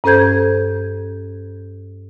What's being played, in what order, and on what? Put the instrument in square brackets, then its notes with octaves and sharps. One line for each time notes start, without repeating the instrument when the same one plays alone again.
[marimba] G2 C#4 A4 C5 G6 G#6